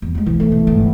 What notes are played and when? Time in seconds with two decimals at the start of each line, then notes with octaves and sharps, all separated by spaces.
0.02 E2
0.15 G3 G#3
0.26 B1 E3
0.40 E3 A3
0.52 B2
0.67 G1 G#2